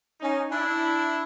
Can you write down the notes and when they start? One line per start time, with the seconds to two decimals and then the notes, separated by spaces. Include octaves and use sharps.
0.21 C#4 D#4
0.51 D4 E4